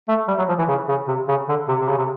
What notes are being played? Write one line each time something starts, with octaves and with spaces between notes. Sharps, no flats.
A3
G3
F#3
F3
E3
C#3
C#3
C3
C#3
D3
C3
C3
C#3
C3